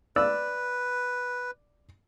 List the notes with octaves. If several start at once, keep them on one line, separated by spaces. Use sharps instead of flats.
B4 D5 E6